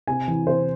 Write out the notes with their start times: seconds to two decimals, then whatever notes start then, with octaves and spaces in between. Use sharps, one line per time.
0.07 C3 G#5
0.28 E3
0.47 C3 C5